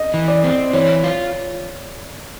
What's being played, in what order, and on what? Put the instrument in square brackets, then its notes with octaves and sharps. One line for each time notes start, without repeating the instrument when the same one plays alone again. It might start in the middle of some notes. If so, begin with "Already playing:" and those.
Already playing: [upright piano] D#5
[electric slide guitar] E3
[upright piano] D5
[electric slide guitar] C4
[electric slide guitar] E3 [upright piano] C#5
[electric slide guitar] F4